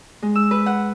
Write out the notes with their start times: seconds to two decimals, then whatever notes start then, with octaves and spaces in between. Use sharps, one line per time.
0.22 G#3
0.35 E6
0.51 B4
0.66 F#5